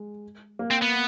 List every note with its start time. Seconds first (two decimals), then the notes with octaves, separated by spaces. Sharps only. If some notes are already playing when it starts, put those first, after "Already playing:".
Already playing: G#3
0.59 A#3
0.71 C4
0.82 B3